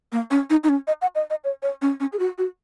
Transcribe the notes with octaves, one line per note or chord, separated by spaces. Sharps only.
A#3
C#4
D#4
D#4
C#4
D#5
F#5
D#5
D#5
C#5
C#5
C#4
C#4
G#4
F#4
F#4